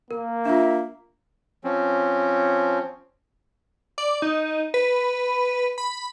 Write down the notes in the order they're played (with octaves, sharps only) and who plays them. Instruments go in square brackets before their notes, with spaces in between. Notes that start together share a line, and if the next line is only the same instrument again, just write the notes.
[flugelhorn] A#3 [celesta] A#4
[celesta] D4 F4 [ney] E5
[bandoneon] F3 C4 C#4
[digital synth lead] D5
D#4
B4
B5